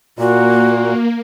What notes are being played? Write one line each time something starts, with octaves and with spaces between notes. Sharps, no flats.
A#2 A#3 F#4